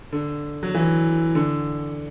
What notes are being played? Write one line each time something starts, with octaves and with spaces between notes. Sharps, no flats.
D3
F#3
E3
D3